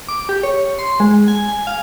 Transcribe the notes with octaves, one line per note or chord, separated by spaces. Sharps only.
D6
G4
C#5
C6
G#3
G#5
G#5
F5